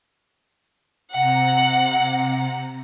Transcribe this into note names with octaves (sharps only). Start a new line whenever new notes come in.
C3 F#5 A#5